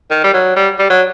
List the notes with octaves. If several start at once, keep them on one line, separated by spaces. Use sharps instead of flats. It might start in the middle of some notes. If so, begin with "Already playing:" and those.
D#3
G3
F#3
G3
G3
F#3